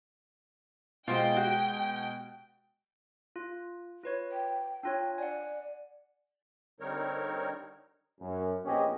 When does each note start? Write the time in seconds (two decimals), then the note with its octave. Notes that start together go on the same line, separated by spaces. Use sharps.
1.08 B2 G#3 F4 C5 D#5 G5
1.37 F#4
3.36 F4
4.03 F4 B4 C#5
4.32 G5
4.83 D4 F4 C#5 G5
5.18 D5 F#5 G#5
6.80 D3 G3 C4 D#4 A#4 C#5
8.21 F#2
8.65 A#1 B3 C#4 G4 G#4 D#5